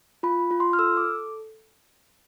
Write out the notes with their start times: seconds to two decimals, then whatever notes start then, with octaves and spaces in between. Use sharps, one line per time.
0.23 F4 B5
0.51 F4
0.60 C6
0.73 F6
0.79 A4 E6
0.97 D6